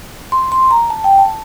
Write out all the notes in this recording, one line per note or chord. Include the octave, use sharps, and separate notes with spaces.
C6
C6
A#5
A5
G5
A5